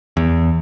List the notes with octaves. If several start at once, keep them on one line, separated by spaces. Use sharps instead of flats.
E2